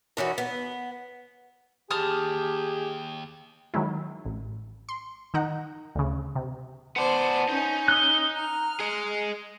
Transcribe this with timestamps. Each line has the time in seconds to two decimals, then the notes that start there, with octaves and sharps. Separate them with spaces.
0.17 D#3 E3 C#4 F#4
0.38 B3
1.91 D#2 G4 G#4 A5 D#6 F6
3.74 D#3 F#3 G#3 E4
4.25 A1
4.89 C6
5.34 D#3 D#4 F#5
5.95 D2 C#3
6.35 C3
6.96 B3 C5 D5 A5
7.49 C#4 D#4
7.88 D#6 E6 F#6 G7
8.36 A#5 F6
8.80 G#4 D#5 C#7